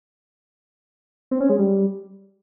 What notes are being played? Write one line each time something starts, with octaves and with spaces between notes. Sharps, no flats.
C4
C#4
G#3
G3